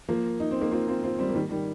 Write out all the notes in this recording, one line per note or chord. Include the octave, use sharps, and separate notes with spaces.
F3 A#3
D#4
C4
A#3 D#4
C4 F4
C4 F4
C4 F4
G3 C4
A#3
D#3 G3
D#3 G3